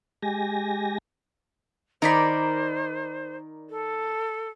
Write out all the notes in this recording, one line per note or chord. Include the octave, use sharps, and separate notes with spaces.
G#3 G4 G#5 A#6
D#3 D#4 A#4 C5 D5 B5
A4